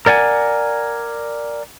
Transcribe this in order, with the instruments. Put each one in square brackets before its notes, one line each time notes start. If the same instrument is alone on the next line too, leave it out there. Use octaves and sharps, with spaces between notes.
[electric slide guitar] A#4 D5 F#5 G#5